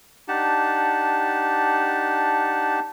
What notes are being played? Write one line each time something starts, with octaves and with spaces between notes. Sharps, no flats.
D4 D#4 G4 F#5 A5